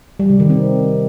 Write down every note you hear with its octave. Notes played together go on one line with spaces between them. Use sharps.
G3
C3
D#3
C4